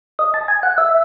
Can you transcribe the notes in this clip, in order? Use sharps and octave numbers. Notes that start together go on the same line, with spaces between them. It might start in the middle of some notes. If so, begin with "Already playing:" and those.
D#5
A5
G#5
F#5
E5